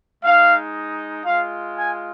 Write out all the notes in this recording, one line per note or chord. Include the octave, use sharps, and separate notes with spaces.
G#3 D#4 F5
G#3 F4 F5
G#5